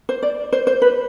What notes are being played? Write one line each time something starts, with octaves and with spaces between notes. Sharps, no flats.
C5
D5
C5
C5
B4